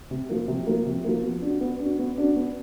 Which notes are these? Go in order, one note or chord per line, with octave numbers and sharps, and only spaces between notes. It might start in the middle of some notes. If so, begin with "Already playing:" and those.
C3
F3 A#3
C3
F3 A#3
C3
F3 A#3
B3
D4 F#4
B3
D4 F#4
B3
D4 F#4
B3